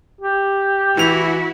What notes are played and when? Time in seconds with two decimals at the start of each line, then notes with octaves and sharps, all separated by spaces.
0.21 G4
0.97 E3 E4 F#4 F7